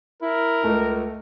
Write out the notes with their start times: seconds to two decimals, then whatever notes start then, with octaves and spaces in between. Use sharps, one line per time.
0.22 E4 A#4
0.64 C#2 A3